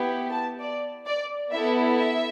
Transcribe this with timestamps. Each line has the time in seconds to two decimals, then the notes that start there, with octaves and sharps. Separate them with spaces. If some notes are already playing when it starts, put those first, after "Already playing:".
Already playing: B3 E4 G4
0.31 A5
0.60 D5
1.06 D5
1.51 B3 E4 A4 E5
1.96 E5